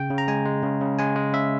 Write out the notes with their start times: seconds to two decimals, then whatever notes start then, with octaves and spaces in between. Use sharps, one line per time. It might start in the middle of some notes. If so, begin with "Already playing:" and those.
Already playing: C#3 G5
0.10 C#3
0.18 A#5
0.28 G#3 G#5
0.45 G#3
0.63 C#3
0.81 C#3
0.99 G#3 G#5
1.16 G#3
1.33 C#3 E5